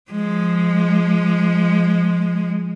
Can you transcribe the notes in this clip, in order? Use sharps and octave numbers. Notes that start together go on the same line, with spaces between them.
F3 G#3